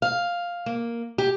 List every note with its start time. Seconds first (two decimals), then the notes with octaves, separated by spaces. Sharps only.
0.02 F5
0.66 A#3
1.18 G4